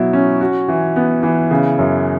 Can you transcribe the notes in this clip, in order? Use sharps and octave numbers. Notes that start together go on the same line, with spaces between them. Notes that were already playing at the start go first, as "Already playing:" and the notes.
Already playing: B2 F#3 E4
C#4
F#4
E3
B3
E3
C#3
F#2